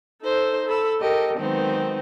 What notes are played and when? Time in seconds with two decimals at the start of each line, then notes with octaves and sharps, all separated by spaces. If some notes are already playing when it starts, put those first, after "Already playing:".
0.23 D#4 A4 C5
0.67 A4 B5 E6
1.01 G4 A4 A#4 D#5
1.37 D#3 F#3 G#3 B3 C4 D#4